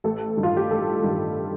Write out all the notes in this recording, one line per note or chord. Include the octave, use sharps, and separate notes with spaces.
A1 A4
G2 D#3
F4
G4
A1 A4
G2 D#3